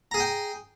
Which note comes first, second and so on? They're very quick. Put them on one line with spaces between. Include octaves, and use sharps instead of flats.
A#5 G#4 G#5 G5